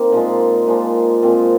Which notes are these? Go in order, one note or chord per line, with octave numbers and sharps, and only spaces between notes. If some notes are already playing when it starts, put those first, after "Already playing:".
Already playing: A#3 C4 D#4
A#2 F3 G#3
A#2 F3 G#3
A#2 F3 G#3 C4